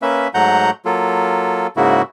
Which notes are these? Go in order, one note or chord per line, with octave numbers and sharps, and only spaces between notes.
A#3 C#4 B4 E5
G#2 F#3 A3 F#5 A#5 G6
F#3 A#3 F4 A4
G#2 C#3 A#3 E4 F#4